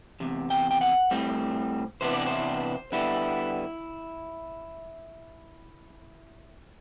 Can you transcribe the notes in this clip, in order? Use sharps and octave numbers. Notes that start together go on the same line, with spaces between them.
E2 C3
G5
G5
F#5
A2 G3 C4
C3 E3 B3 D4 C5
D5
C5
D3 G3 B3 E4